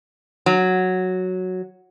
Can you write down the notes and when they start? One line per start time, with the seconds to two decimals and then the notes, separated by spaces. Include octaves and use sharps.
0.46 F#3